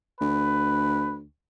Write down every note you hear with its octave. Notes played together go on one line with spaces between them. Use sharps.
D2 B4